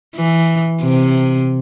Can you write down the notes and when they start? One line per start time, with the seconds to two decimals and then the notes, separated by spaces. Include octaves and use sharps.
0.16 E3
0.82 C3